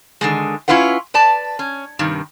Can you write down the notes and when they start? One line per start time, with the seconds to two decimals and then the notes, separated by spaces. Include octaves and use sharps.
0.21 D3 D#3 G#3
0.68 C#4 E4 F4 B4 F#5
1.14 B4 D5 A5
1.59 C#4
1.99 G2 C3 D#3